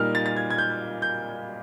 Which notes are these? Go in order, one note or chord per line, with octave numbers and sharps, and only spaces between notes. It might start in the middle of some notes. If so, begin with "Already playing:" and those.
Already playing: A#2 G3 A#3 D#4 F6
A6
A6
G#6
G#6
G6
G6